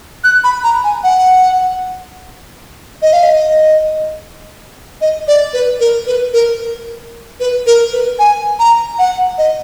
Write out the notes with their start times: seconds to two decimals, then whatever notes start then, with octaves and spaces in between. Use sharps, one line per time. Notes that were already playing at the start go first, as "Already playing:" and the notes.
0.24 F#6
0.44 B5
0.64 A#5
0.84 G#5
1.03 F#5
3.02 D#5
3.13 F5
3.23 D#5
5.01 D#5
5.28 D5
5.53 B4
5.80 A#4
6.07 B4
6.33 A#4
7.40 B4
7.66 A#4
7.92 B4
8.19 G#5
8.59 A#5
8.99 F#5
9.38 D#5